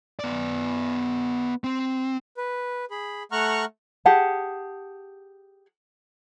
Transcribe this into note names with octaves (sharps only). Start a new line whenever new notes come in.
B3 D5
C4
B4
G#4 B5
A3 F#5 A#5 C#6 F6 F#6
G4 G#4 F#5 A5